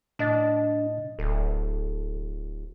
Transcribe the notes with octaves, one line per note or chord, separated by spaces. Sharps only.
A2 D4 D#5 A6
D1 A4